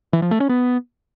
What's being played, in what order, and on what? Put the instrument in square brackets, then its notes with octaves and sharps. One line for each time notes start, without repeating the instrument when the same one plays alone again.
[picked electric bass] E3
F3
A3
C#4
B3